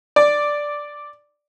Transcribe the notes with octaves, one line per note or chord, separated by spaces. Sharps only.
D5